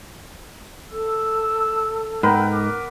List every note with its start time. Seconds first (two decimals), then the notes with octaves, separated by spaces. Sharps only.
0.91 A4 E6
2.23 G#2 B3 A#4 B4 G5
2.53 D6